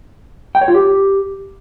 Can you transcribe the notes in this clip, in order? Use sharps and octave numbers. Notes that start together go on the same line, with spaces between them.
G5
C#5
F4
G4